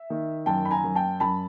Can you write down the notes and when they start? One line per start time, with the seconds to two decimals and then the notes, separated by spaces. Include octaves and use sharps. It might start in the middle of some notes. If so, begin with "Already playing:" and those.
Already playing: E5
0.10 D#3
0.46 F#2 G5 A5
0.65 B5
0.71 G#5 A#5
0.84 F#2
0.95 G5 A5
1.20 F#2 A5 B5